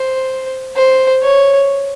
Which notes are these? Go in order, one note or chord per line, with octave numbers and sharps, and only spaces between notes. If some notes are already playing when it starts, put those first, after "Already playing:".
Already playing: C5
C5
C#5